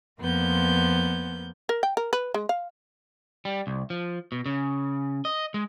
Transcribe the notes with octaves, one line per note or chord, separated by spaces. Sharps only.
F2 F3 A#3 B3 G6
A#4
G5
A#4
B4
G#3
F5
G3
C2
F3
B2
C#3
D#5
G#3